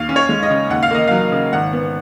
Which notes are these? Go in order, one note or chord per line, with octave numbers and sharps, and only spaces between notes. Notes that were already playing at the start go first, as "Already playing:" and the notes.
Already playing: D#2 F5
C#4
C#5
G#3
D#5
C#3
D#2 F#5
F5
A#3 D#5
F#3 F5
C#3
G#1 F#5
B3